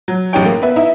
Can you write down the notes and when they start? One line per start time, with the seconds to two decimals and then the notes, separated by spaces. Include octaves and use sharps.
0.08 F#3
0.33 A1 F#2 D#4 G4 C#5 G5
0.45 A#3
0.62 B3 B4 E5
0.76 D#4 E4 E5